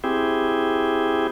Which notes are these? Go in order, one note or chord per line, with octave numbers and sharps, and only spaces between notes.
C4 E4 G4 G#4